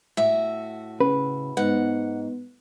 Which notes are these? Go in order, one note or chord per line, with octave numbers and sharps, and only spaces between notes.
A2 F#4 E5
C#3 B4
G#2 B3 F#5